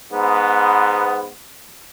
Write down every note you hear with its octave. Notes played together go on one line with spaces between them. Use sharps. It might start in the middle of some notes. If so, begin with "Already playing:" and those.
G#2 B3